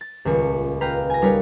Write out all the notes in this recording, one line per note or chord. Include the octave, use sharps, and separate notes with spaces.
A6
D#1 C#2 C#6 C#7
B4 F5 G5 A#5 B5
G#5 A#6
G3 D#4 A#4 B4 C#5